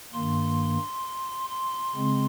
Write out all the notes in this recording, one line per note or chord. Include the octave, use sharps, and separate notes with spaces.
G2 D#3 A#3 C6
C6
C#3 G#3 C4